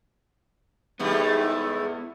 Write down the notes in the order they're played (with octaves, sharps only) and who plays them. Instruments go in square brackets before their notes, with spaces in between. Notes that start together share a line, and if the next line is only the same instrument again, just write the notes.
[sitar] G#2 G3 A3 [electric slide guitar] B3 E4